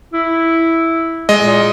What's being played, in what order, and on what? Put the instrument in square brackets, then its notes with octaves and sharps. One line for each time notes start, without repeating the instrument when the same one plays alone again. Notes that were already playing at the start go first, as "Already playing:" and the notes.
[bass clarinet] E4
[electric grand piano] G#3 D#5
[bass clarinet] A#2